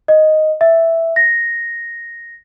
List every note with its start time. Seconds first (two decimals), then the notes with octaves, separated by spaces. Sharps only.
0.08 D#5
0.61 E5
1.16 A#6